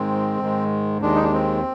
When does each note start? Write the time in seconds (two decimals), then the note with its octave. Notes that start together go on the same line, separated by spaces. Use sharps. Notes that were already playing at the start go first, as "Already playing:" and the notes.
Already playing: G#2 D#3 G#3 C4
0.40 G#2 D#3 G#3
1.02 D#2 D#3 G#3 D4
1.15 D#4
1.23 D4
1.33 C4